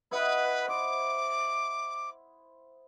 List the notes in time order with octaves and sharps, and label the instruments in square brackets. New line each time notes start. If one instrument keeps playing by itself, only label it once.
[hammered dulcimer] E4 D#5 F#5 [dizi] B4
[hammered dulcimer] C5 [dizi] D6